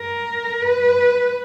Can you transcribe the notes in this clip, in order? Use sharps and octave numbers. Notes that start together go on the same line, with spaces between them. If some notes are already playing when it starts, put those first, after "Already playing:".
Already playing: A#4
B4